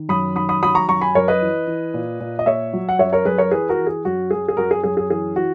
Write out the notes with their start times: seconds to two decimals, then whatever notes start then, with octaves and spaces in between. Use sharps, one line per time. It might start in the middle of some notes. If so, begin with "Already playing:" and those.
Already playing: D#3
0.09 F#2 B5 D#6
0.35 D#3 B5 D#6
0.49 B5 D#6
0.63 F#3 B5 D#6
0.75 A#5 C#6
0.88 F#2 A#5 C#6
1.01 G#5 B5
1.15 F#2 A#4 C#5
1.28 B4 D#5
1.42 E3
1.67 E3
1.94 A#2
2.20 A#2
2.39 D#5
2.46 A#2 C#5 E5
2.73 F#3
2.89 F#5
2.99 F#2 C#5 E5
3.13 A#4 C#5
3.25 F#2 G#4 B4
3.38 A#4 C#5
3.51 E3 G#4 B4
3.69 F#4 A#4
3.78 E3
3.87 G#4
4.05 F#2 F#4
4.31 F#3 G#4
4.48 G#4
4.57 F#2 F#4 A#4
4.71 G#4
4.84 F#2 G#4
4.97 G#4
5.10 E3 G#4
5.36 E3 F#4